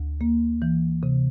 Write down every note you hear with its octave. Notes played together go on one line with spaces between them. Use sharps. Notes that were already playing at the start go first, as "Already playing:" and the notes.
Already playing: D2
A#3
E3
C3